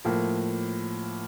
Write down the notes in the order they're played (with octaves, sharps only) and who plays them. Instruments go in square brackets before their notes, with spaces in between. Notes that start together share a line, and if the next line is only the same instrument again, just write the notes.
[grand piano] A2 F3 A#3